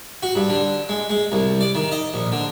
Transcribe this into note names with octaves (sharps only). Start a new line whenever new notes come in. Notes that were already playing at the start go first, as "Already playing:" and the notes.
F#4
G2
D3
G#3
G#3
C2
D5
D#3
D#5
A#1
D3